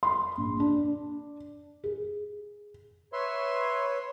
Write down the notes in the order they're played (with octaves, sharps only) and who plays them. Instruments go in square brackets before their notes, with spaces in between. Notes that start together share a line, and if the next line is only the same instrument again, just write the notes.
[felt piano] B5 C6
A#1
D4
G#4
[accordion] B4 C#5 [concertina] E5 C6